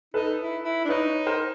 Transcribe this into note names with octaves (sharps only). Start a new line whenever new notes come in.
D#4 A4 B4
E4
E4
D4
D#4 B4 C#5
A#4 C5